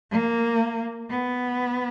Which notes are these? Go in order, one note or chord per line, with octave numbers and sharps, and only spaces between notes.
A#3
B3